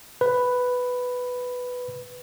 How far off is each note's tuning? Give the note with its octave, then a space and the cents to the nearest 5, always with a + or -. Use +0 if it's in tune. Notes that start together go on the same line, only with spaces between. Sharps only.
B4 +5